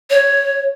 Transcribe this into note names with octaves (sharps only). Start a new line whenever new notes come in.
C#5